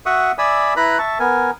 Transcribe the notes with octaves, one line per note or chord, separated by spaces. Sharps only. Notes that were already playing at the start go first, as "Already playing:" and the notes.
F#4 E5 F#5 C#6 D#6
D5 E5 G#5 B5 D#6 E6
E4 B4 A#5 B5 F#6
E5 A5 C#6
B3 A#4 G#5